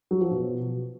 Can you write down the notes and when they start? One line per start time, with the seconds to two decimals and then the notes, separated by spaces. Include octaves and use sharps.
0.11 F#3
0.21 F3
0.31 B2